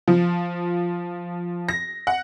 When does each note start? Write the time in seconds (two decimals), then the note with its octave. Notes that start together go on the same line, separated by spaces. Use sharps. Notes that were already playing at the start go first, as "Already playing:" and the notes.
0.08 F3
1.69 A#6
2.07 F#5